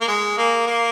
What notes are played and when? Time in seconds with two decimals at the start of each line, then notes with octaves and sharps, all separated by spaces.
0.01 A#3
0.08 G#3
0.38 A#3
0.67 A#3